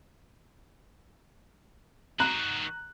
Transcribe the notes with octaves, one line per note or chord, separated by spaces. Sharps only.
D#3 F#4 A#5 F#6